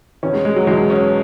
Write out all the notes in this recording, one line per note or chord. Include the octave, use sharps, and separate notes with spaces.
E2 B2 C#4
G#3
G#3
F#3
E2 B2 G#3
C#4